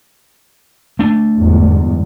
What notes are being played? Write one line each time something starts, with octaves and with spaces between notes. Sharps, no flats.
A3 D4
G1 E2 G#2